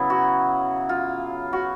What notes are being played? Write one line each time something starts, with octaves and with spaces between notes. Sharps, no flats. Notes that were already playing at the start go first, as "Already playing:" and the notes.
Already playing: C#3 F#3 B3 E4
F#4
F4
F#4